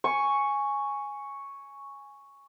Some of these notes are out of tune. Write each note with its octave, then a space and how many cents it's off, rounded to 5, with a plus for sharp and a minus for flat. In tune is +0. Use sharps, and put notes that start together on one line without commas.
G#5 +0 C#6 +0